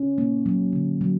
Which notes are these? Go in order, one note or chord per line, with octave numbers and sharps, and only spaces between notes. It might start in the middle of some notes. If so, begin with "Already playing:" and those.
Already playing: C#4
A#3
F#3
D3
F#3